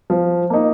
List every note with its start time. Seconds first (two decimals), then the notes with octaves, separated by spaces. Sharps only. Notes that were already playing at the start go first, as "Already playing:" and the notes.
0.10 F3
0.50 A#3 D#4